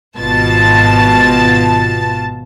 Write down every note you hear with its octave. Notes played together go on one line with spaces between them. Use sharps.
G#1 B2 F4 A5 A6